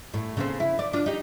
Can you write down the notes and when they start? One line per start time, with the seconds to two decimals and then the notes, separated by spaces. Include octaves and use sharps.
0.14 A2
0.37 C#3 A#3 C4
0.60 E4
0.79 D5
0.93 D4 F4
1.06 D#4 G4